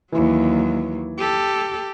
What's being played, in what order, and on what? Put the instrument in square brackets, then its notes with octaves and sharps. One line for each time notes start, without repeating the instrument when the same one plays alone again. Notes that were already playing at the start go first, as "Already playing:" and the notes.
[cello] D#2 F#3 [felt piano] E3
[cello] G4 A4